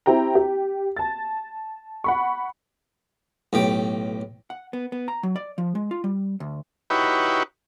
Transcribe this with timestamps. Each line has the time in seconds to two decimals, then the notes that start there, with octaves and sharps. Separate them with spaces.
0.06 C4 E4 G4 G5 A#5
0.35 G4
0.97 A5 A6
2.04 F#5 B5 C#6
3.53 B1 A2 G4
4.50 F#5
4.73 B3
4.92 B3
5.08 A#5
5.23 F#3
5.36 D5
5.58 F3
5.75 G#3
5.91 F4
6.04 G3
6.40 D2
6.90 D#4 E4 F#4 G4 B4 C#5